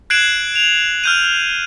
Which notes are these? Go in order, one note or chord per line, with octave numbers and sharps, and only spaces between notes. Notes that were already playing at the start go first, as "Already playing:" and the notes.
F#6 G#6 C7 D7 E7 F#7
F7 F#7
F6 G6 D#7